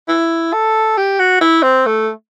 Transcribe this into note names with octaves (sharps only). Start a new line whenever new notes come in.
E4
A4
G4
F#4
E4
C4
A3